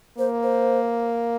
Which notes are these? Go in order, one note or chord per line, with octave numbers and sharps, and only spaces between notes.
A#3 C5
C5